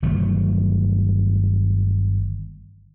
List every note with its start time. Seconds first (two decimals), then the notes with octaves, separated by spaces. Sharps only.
0.02 G1 D#3 F#3 A3